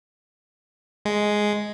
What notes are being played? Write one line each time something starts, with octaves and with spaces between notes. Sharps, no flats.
G#3